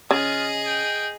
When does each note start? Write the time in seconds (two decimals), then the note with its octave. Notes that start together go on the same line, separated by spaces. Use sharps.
0.11 C#3 F4 G#4 D#5
0.66 G5